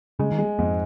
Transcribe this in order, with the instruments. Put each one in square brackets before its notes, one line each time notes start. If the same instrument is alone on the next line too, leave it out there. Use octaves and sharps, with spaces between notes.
[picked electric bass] C#3 [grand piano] G#3
[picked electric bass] D#3
[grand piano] G#3
[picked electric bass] F2 [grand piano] G#2